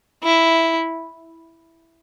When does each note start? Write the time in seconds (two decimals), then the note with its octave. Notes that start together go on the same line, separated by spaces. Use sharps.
0.23 E4